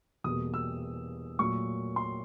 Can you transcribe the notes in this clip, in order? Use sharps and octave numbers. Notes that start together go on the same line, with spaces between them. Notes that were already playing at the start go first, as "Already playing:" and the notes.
E2 B2 G3 A#3 D#6
E6
A#2 F#3 A3 C#6
C6